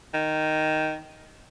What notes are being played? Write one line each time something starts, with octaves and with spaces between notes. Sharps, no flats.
D#3